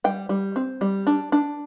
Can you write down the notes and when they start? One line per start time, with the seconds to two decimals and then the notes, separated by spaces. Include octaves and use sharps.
0.04 G3 G5
0.29 G3
0.56 C4
0.81 G3
1.07 D4
1.32 D4